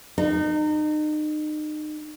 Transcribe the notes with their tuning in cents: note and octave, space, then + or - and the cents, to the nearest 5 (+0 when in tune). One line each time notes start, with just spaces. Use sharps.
D#4 -35